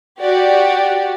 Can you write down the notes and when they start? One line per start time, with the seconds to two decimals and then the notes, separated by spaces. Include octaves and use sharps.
0.20 F#4 G4 D5